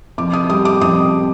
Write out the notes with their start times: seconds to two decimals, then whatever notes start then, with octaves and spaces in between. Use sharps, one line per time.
0.18 F2 D6
0.33 D#6
0.50 G3 D#6
0.65 D6
0.81 F2 D#6